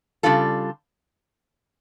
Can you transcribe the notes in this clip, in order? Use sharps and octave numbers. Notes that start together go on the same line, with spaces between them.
C#3 G3 D4 F4 A4